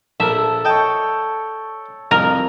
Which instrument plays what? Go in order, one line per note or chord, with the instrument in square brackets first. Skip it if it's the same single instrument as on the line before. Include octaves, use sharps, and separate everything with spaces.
[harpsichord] A#1 A#4 [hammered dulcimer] A4 [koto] E5
[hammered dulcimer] A4 C#5 [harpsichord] D#5 G5 A5
[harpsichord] C2 F2 [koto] A#4